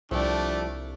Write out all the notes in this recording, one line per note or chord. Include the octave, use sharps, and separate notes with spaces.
C2 F3 G3 A3 D4